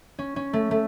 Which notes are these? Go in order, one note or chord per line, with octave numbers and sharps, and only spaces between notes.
C#4
C#4
A3
A3